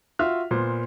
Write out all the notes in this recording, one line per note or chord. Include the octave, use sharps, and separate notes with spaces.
F4 F#4 E5 F6
A#2 B3 C5